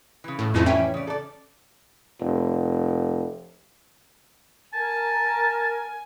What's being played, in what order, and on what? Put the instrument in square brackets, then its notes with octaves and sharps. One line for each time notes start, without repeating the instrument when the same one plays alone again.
[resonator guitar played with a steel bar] C#3 E3
[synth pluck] A2
[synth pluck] F2 E3 F3 [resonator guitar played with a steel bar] G#3 A3 C#4
[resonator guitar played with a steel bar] G3 E5 G5 [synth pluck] C#4
[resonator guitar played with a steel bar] C#3 D5
A4 D5
[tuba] F1
[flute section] A#4 [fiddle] G#5 [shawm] A5